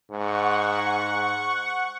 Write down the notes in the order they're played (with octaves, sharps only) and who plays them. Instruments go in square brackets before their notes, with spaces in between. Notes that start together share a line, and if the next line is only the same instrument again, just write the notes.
[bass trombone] G#2 [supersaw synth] F#5 C#6